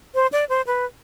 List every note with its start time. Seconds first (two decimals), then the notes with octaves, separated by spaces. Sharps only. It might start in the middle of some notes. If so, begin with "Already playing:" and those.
0.15 C5
0.32 D5
0.49 C5
0.67 B4